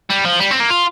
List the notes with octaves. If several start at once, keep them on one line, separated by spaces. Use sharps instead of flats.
G3
F3
G3
C4
A#3
F4